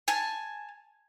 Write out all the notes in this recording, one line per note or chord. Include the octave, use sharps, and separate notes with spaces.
G#5 A5